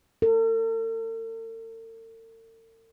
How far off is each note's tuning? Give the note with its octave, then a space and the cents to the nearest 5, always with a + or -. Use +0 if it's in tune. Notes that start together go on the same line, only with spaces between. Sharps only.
A4 +45